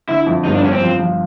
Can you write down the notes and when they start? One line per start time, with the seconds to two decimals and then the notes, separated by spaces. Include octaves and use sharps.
0.08 D3 E4
0.26 F2
0.45 G1 D#4
0.54 D4
0.63 G1 C#4
0.71 C4
0.81 F3
0.99 F3